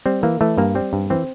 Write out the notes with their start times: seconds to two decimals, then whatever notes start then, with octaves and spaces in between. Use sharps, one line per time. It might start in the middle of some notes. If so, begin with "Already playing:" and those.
0.06 G3 C4
0.23 E3 A#3
0.41 E3 A3
0.57 G2 A#3
0.75 G3 C4
0.93 G2
1.10 E3 C4